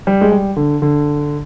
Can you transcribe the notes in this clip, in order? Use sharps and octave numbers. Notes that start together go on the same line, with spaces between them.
G3
G#3
G3
D3
D3